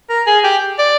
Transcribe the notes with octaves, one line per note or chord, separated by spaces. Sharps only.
A#4
G#4
G4
D5